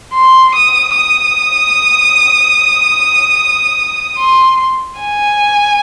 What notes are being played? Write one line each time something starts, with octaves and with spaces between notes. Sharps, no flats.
C6
D#6
D#6
C6
G#5